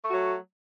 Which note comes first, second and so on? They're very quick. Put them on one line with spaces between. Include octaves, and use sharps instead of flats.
A3 F#4 F#3